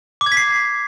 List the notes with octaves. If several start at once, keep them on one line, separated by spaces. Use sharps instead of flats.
D6
G#6
B6
C7